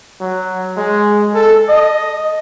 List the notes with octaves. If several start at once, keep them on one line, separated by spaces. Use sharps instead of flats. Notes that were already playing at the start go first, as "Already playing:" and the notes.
F#3
G#3
A4
D#5